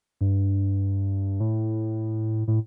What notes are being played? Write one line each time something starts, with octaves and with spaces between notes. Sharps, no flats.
G2
A2
A2